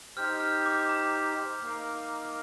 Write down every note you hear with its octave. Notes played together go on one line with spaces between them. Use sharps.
D#4 G4 C5 F6
F6
D6
A#5
A#3 D#4 A#4 F5